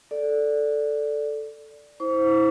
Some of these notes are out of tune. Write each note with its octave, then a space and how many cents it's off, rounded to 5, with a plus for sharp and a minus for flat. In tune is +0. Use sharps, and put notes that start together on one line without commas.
A4 +0 D5 +0
E4 -25 C5 +0 C#6 +45